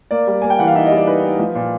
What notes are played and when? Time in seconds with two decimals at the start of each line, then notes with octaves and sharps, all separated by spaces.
0.11 A#3 D5
0.27 G3
0.42 A#3 G#5
0.50 G5
0.59 E3 F#5
0.67 F5
0.75 D#4 E5
0.86 D#5
0.91 G3
0.97 D5
1.07 D#4 B4
1.23 D#4
1.39 F3
1.55 A#2